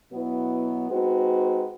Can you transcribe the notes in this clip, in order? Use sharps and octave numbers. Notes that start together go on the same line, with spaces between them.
B2 F#3 B3 E4
G#3 C4 D#4 F#4 B4